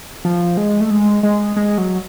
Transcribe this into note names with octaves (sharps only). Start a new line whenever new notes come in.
F3
G#3
A3
G#3
G#3
G#3
F#3